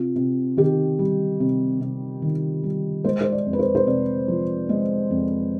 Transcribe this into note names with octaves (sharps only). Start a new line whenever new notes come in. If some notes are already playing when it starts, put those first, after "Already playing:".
Already playing: C3 F4
C3
D#3 G4
G3
C3
C3
D#3
G3
G#3 C5
C5
D5
F2
B4
C5
C5
C3 D5
F3
G#3
F2